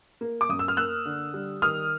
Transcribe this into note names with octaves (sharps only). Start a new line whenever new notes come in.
A#3
D6
F#2 D#6
E6
F6
A#3 E6 F#6
D3
G3
D#3 D#6 F6